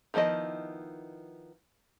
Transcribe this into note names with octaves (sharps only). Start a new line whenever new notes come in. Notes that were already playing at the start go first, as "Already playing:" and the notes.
D#3 F3 B3 E4 D#5